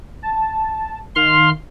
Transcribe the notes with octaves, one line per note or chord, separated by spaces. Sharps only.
A5
D#3 F5 C6 F6